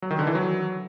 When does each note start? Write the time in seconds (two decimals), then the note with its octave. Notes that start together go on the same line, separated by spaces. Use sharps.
0.02 F#3
0.11 D#3
0.19 D3
0.27 E3
0.35 F#3